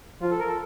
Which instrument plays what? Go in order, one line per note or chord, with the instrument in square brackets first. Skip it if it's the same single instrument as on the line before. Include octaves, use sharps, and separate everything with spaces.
[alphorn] F3 [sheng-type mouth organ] F4
[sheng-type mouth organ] A4
A#4
A4